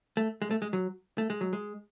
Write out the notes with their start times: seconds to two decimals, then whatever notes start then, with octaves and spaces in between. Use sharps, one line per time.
0.17 A3
0.42 G#3
0.51 A3
0.62 G#3
0.73 F#3
1.18 A3
1.30 G#3
1.41 F#3
1.53 G#3